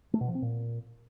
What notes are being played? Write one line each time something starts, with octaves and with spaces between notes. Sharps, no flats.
A3
B2
F3
C4
A#2